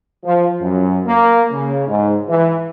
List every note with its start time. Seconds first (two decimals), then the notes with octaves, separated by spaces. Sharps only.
0.24 F3
0.61 F#2
1.06 A#3
1.52 C#3
1.88 G#2
2.29 E3